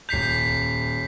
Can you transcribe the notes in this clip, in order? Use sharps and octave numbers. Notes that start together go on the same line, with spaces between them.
D#1 G6 B6 C7 F7